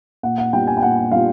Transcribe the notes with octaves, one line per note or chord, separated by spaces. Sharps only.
A#2 F#5
F#5
G3 B3 D4 F4 G5
G#5
G5
A#2 F#5
G3 B3 D4 F4 F5